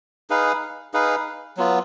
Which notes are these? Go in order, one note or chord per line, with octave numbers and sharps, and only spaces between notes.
D#4 G#4 B4 F5
D#4 G#4 B4 F5
F#3 B3 F4